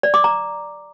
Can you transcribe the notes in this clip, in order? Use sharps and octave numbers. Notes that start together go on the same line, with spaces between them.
D5
D6
A#5